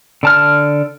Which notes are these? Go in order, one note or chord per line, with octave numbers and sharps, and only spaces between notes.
D3 A5 F6